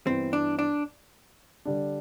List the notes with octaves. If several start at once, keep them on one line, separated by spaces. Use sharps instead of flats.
G2 E3 B3 C4 E4
D4
D4
D3 G3 D4